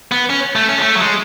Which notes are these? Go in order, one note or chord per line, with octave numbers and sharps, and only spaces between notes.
B3
C#4
A3
C#4
G#3
A3
F#3
G#3